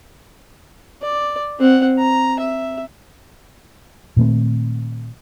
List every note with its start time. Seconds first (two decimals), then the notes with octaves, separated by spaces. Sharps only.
1.02 D5
1.60 C4 F#5
1.98 A#5
2.39 E5
4.17 A#2 D#3 A3 C4